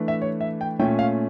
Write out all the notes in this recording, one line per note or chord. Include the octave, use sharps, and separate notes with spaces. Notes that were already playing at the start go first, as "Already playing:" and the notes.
Already playing: E3 A3 D4
E5
C#5
E5
G5
A#2 A3 C#4 G5
F5